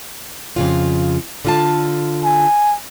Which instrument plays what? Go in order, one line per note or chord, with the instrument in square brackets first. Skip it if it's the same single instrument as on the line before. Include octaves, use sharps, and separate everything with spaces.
[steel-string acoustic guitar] F2 C#3 F4
D3 F4 A5
[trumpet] G#5